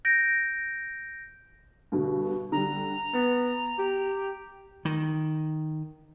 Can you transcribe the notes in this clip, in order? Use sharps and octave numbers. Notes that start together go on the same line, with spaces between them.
G6 A#6 D7
G2 B2 D3
D3 G3 A#5
B3 A6
G4
D#3